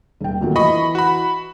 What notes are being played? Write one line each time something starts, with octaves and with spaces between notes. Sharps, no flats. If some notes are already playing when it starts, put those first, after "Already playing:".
D#1 G5
D2 A#2 F#3
E3 D#5 B5 C#6
F#4 B5